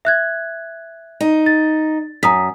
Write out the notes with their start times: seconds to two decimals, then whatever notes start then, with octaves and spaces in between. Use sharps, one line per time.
0.05 E5 F#6 G#6
1.21 D#4
1.46 A6
2.23 F#2 A#5 D#6 B6